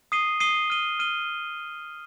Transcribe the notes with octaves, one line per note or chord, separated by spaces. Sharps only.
D#6 C7 D#7 G7
D#6 C7 D#7 G7
F6 D#7 G7
F6 D#7 G7